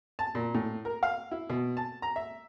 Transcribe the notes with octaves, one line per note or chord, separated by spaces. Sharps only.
A5
A#2
A2
A#4
F5
E4
B2
A5
A#5
E5